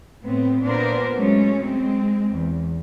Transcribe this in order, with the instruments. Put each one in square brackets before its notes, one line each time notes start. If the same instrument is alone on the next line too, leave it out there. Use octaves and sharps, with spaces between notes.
[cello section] A2 B3 C4
A#2 B3 D4 A#4 C5
F#3 G#3 A3 C#4
G#3 C4
E2